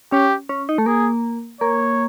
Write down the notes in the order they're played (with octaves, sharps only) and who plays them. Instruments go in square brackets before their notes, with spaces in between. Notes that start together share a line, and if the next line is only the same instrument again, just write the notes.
[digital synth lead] C#4 [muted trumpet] G4
[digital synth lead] C#4
D#4
A3
[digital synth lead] A#3 [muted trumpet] G#4
[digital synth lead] A#3 [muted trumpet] C#5